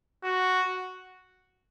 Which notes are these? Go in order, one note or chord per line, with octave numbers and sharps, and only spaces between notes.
F#4